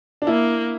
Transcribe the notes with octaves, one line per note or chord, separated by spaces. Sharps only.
D4
A#3 E4